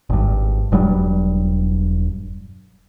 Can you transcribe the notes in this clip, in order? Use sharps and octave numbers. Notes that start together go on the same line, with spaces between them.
G#1 G2
E1 G2 F#3 G3